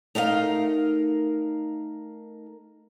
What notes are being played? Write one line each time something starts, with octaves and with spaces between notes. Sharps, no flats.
A3 D#4 A#4 F5